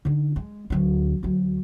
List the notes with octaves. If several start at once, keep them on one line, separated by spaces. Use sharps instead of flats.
D3 D#4
G#3
D2 F#3
D2 F#3